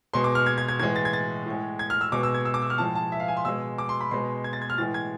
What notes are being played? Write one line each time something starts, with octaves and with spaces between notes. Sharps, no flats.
B2 G#3 C6
D6
F6
G#6
G#6
G#6
A2 E3 G#3 G#6
A6
G#6
A6
A2 G#3
G#6
F6
E6
B2 G#3 D6
E6
G#6
E6
D6
E6
F6
A2 F3 G#3 A5
A5
E5
F5
G#5
C6
B2 G#3 E6
D6
C6
B5
B2 G#3 C6
G#6
A6
G#6
F6
A2 E3 G#3 A6
G#6